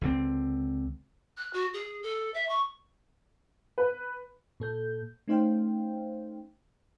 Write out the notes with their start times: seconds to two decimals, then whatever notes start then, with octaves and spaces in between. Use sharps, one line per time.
0.01 C#2 D3 C4
1.37 F#6
1.53 F#4
1.73 G#4
2.03 A4
2.34 E5
2.49 C#6
3.78 B4
4.60 A#2 A4 G6
5.28 A3 C#4 D#4 C5 F5 G5